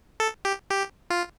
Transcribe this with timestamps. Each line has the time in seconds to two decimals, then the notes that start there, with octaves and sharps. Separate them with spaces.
0.20 A4
0.45 G4
0.71 G4
1.10 F4